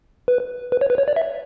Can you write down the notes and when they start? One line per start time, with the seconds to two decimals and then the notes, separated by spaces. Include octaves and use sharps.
0.28 B4
0.72 B4
0.81 C#5
0.90 B4
0.98 C#5
1.08 D5
1.16 E5